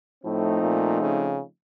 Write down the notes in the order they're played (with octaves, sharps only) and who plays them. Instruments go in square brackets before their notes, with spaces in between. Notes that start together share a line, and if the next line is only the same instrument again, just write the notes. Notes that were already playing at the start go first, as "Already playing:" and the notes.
[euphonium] A2 [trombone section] F3 A3 C4 D#4
[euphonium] A#2
C#3